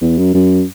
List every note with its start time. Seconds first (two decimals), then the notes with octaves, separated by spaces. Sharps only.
0.01 E2
0.18 F#2
0.34 F#2